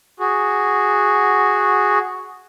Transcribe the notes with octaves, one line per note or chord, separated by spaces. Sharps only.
F#4 G#4